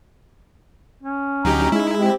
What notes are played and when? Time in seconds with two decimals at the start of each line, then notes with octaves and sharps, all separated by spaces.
1.03 C#4
1.45 D2 F#3 D#4 G4 A#5
1.72 G#3 D#4 E4
1.99 C4 G4